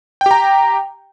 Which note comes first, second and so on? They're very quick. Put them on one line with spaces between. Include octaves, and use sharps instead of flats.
G5 G4 A#5